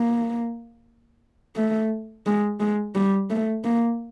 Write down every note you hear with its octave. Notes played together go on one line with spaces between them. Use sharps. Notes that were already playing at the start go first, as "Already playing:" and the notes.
Already playing: A#3
A3
G#3
G#3
G3
A3
A#3